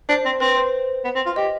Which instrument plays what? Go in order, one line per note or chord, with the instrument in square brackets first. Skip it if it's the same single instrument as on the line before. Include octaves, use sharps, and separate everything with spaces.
[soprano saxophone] D4 [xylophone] C5
[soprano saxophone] C4
[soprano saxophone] C4 [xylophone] B4
[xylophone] C5
[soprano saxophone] B3
C4
F4
[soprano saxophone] G4 [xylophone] D#5